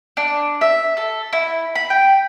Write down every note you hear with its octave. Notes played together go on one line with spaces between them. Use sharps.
D4
E5
A4
E4
B5
G5